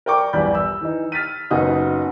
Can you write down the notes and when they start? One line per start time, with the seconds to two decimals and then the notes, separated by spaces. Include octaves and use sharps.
0.06 A#4 D5 G5 C#6 D6
0.33 A#1 E2 G2 D5 B5 G6
0.55 E6
0.81 E3 D#4
1.12 F6 A6 B6 D#7
1.50 F#1 C#3 B3 D#4 F#4 D#6